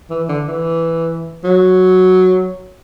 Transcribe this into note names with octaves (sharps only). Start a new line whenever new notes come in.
E3
D3
E3
F#3